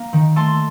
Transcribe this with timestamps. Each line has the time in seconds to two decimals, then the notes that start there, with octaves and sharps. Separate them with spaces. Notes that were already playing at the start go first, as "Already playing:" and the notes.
Already playing: A#3
0.13 D#3
0.36 A3 A5 C6